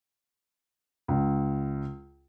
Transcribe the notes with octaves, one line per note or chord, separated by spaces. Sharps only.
C#2